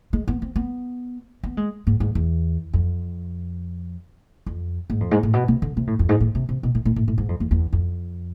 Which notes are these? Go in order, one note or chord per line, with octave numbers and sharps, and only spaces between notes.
G#3
B3
C4
B3
B3
G#3
G#2
G#2
E2
F2
F2
G#2
F2
G#2
A2
B2
C3
D3
C3
A2
F2
G#2
A2
C3
C3
B2
A2
A2
A2
A2
G#2
F2
E2
E2
F2